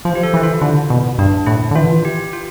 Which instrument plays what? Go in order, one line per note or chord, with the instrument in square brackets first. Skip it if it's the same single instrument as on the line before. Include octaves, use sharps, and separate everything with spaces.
[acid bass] F3 [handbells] C5
[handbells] G4
A4
[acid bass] E3 [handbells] E4
[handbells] F4
[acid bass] D3 [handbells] E4
[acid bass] B2
[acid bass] G2 [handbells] D4
[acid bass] A2 [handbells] E4
[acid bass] D3
[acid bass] E3 [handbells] F4
[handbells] G4
F4